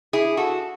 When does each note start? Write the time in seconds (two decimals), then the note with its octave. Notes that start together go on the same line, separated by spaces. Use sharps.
0.13 E4 G#4
0.37 F#4 A4